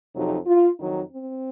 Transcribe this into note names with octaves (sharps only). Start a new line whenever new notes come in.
F2 C3 F#3 D#4
F4
F2 D#3 F#3 D#4
C4